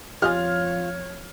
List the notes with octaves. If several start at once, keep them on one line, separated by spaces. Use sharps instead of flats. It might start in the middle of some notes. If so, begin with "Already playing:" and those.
F2 F4 G4 C#5 D#5 G#5 F6